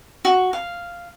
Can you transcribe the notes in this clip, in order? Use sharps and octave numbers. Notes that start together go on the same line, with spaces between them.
F#4
F5